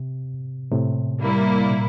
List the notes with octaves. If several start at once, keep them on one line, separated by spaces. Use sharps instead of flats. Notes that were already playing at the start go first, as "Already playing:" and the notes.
Already playing: C3
A2 C3
G3 A#3 E4
A#2